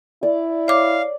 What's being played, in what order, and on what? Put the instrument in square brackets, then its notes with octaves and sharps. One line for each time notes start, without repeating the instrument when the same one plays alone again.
[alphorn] E4 [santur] D5
[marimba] C#5 D6 [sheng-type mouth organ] F5